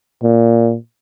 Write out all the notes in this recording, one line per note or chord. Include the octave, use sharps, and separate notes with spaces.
A#2